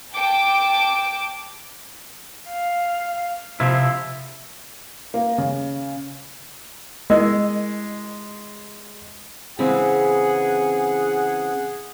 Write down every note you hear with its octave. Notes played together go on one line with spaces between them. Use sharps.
G5 A5 D6 D7
F5
C3 F3 E4 C5 E5
A#3
C#3
G#3 E4 A#4 D#5
C#3 E3 C4 G#4 F#5